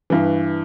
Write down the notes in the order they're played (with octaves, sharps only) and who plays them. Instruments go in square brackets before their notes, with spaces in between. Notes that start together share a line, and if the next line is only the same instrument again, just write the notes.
[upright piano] G2 E3